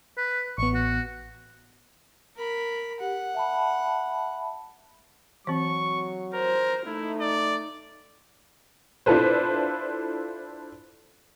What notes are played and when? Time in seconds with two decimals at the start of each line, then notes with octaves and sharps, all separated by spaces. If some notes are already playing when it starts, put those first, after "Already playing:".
0.17 B4
0.58 A1 B3 C#6
0.74 F#4
2.36 A#4 B5
3.00 G4 F#5
3.35 E5 A5 B5
5.47 E3 F#3 C4 C#6
6.34 A#4 C5
6.86 A3 D#4 E4
7.20 D5
9.06 D4 E4 F4 A4 B4 C5